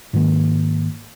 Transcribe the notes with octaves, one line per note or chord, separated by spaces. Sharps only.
G#2 D#3 A#3